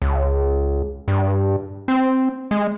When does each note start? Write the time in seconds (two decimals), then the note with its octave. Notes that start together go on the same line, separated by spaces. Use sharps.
0.02 C#2
1.08 G2
1.88 C4
2.51 G#3